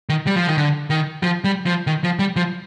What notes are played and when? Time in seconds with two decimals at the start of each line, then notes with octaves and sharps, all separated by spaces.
0.09 D#3
0.27 G3
0.36 F3
0.47 D#3
0.58 D3
0.90 D#3
1.23 F3
1.44 G3
1.66 F3
1.87 D#3
2.04 F3
2.19 G3
2.36 F3